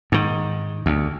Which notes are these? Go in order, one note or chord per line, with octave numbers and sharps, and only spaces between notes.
G#2 D#3
D2